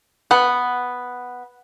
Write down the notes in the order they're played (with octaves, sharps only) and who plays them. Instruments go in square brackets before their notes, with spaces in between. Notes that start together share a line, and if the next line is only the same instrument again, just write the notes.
[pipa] B3 [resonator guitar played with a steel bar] F#5